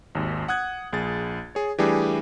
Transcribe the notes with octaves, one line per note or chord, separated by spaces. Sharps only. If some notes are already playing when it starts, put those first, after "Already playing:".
G#1 D#2
F#5 D#6 F#6 G#6
A#1 G#4 A6
G#4 C#5
E3 G3 A3 D4 G4 G#4